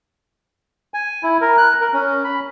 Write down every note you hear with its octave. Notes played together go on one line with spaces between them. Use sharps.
G#5
E4
A#4
F#6
A#4
C#4
B5